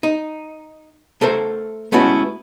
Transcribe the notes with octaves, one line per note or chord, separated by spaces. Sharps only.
D#4
A3 A4 A#4 C5
G#3 A3 B3 C#4 E4 F#4